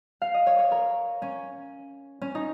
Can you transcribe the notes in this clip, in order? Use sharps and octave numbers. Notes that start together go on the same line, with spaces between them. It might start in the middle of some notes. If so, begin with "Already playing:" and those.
F5
D#5
C#5
C#5
A#4
C#4
C#4
D#4